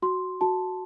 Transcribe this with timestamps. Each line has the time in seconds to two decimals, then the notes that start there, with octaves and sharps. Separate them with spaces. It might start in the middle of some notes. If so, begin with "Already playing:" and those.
0.02 F#4 C6
0.41 F#4 A5